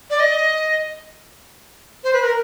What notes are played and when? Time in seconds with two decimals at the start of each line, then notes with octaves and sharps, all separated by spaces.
0.10 D5
0.20 D#5
2.04 C5
2.13 B4
2.23 A#4